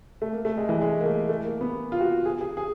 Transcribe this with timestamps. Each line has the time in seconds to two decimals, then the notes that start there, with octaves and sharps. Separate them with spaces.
0.22 A3
0.33 A#3
0.45 A3
0.57 G#3
0.69 E3
0.81 G#3
1.01 A#3
1.05 A3
1.29 A3
1.45 A#3
1.61 B3
1.92 F4
2.00 F#4
2.25 G#4
2.41 G#4
2.57 G#4